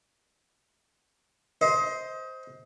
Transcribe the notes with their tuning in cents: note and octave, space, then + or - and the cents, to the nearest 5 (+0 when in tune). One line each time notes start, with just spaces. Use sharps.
C5 +0 D#5 +30